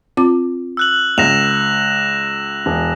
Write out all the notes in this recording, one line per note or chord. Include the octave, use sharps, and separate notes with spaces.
C4 F4 D6
E6 F#6 F#7
C#2 A#6 E7 F7
E1